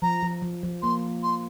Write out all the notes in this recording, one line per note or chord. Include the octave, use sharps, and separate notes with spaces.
F3 A#5
F3
F3
F3
A#3 C6
C6